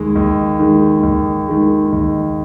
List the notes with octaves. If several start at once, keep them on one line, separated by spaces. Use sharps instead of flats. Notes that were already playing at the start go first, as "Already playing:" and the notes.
Already playing: D#2 D#3 G#3
D#2
D#3 G#3
D#2
D#3 G#3
D#2